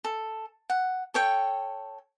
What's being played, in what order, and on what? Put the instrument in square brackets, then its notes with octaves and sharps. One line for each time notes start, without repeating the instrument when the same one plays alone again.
[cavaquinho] A4
F#5
A4 C#5 G5